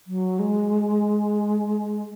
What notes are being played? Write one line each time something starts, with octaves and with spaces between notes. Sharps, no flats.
F#3
G#3